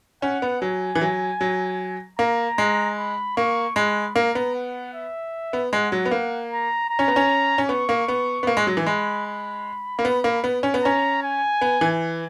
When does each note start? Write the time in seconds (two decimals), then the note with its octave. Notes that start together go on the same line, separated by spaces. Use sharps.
0.22 C#4 F#5
0.42 B3
0.62 F#3 G#5
0.95 E3
1.01 F#3
1.41 F#3
2.19 A#3 A#5
2.58 G#3
2.97 B5
3.37 A#3 C#6
3.76 G#3 B5
4.16 A#3 A#5
4.35 B3
4.54 F#5
4.94 E5
5.53 B3
5.73 G#3 F#5
5.92 F#3
6.05 B3
6.11 A#3
6.52 A#5
6.90 A#5
6.99 C#4
7.08 B3
7.16 C#4
7.58 C#4
7.69 B3 C#6
7.89 A#3
8.08 B3
8.43 B3
8.47 A#3
8.57 G#3
8.67 F#3
8.77 E3
8.86 G#3 B5
9.26 B5
9.99 A#3
10.05 B3
10.24 A#3
10.44 B3
10.63 C#4
10.74 B3
10.83 C#4 A#5
11.23 G#5
11.61 B3
11.81 E3